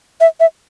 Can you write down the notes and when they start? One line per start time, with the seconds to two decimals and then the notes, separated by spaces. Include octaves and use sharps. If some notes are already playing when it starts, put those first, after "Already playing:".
0.20 E5
0.40 E5